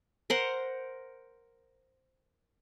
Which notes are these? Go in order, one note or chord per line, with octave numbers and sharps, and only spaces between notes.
A#4 C5 F#5